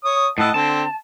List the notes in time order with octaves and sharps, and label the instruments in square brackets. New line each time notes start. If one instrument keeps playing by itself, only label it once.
[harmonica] C#5 D#6
[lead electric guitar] A2 E4 [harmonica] D#5 F#5 A5
[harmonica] D3 C4 [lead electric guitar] A5